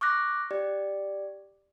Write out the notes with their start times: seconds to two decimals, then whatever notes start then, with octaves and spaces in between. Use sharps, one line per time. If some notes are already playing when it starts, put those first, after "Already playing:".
0.01 C#6 D6 F6 F#6 A#6
0.51 G4 D5